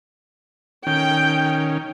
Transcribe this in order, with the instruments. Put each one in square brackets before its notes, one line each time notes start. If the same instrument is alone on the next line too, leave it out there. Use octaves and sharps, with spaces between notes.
[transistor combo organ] D#3 C#4 [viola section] G5